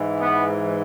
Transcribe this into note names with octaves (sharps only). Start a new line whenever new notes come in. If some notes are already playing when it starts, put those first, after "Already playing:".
Already playing: G#2 E3
B3